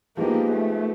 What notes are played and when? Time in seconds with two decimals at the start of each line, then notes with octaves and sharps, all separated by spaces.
0.17 F3 G#3 A#3 B3 D#4 G4
0.50 A3